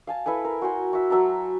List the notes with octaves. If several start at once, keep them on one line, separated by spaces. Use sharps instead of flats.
F5 G#5 A5
E4 A4 B4 G#5
A#4
F#4 C5 G#5
F#4 E5
F#3 E5 A5 A#5